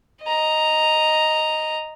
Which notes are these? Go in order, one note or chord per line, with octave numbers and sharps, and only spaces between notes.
D#5 A#5